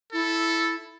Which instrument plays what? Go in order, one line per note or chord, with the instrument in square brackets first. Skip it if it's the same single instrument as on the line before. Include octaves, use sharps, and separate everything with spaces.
[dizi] E4 [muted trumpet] A4